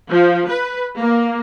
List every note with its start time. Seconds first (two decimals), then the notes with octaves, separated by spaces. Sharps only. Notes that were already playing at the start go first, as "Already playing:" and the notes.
0.11 F3
0.48 B4
0.98 A#3